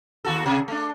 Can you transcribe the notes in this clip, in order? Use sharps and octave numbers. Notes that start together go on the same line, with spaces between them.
D#2 F#4 A4
C3 G#4
A3 D4